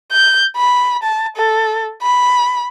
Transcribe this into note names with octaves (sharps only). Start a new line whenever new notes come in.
G6
B5
A5
A4
B5